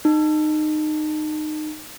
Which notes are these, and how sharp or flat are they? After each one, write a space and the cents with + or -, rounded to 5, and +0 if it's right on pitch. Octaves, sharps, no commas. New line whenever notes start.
D#4 -20